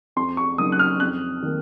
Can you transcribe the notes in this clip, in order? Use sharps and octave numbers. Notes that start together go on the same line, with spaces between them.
F2 C6
C#6
C#3 F#3 A#3 D#4 D#6
F#6
F6
F2 F#6
D#3 A#3